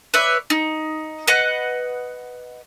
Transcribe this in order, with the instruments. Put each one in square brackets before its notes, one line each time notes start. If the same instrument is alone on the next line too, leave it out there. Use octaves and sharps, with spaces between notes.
[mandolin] B4 C#5 D5 E5
D#4
B4 D#5 F#5